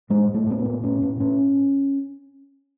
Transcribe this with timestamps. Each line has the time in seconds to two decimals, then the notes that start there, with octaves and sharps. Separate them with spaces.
0.10 A2 G#3
0.29 A2
0.34 A3
0.47 A2 C4
0.59 B3
0.65 A2
0.84 A2 C#4
1.02 A2
1.20 A2 C#4